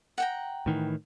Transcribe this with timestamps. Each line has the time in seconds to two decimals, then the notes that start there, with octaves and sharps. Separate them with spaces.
0.18 F#5 G5 A#5
0.66 A2 D#3 E3